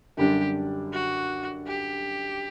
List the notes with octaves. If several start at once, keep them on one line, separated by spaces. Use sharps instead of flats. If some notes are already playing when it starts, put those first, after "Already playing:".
F#2 D3 G3 D4 G4
F#4
G4